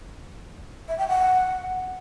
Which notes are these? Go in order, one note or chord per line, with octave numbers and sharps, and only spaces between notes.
E5
G5
F#5